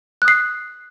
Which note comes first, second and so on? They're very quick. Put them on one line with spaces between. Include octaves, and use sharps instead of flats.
F#6 D#6 C7